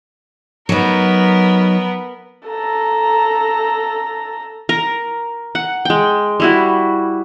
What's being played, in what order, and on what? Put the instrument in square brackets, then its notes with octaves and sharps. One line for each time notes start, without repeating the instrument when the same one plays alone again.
[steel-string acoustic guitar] F#3 D#4 [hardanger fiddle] B3 A#4
[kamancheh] A4 A#5
[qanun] A#4
F#5
G#3 G5
G3 E4 F#4